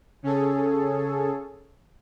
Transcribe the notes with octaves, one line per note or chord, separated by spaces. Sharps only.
C#3 C#4 G#4 A4